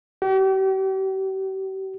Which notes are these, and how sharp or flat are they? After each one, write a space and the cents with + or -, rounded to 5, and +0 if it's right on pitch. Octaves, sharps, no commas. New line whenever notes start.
G4 -40